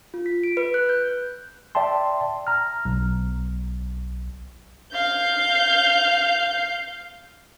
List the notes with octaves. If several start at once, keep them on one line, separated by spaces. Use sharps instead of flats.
F4
B6
D7
B4
F#6
G6
D5 E5 G5 A5 C6
A#5 F6
B1
F5 G6